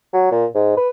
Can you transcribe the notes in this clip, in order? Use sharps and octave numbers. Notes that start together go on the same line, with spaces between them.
F#3
A#2
G#2
B4